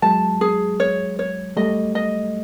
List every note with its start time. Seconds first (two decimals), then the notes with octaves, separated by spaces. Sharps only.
0.02 F#3 G#3 A5
0.41 G#4
0.80 C#5
1.19 C#5
1.57 G3 A3 D#5
1.95 D#5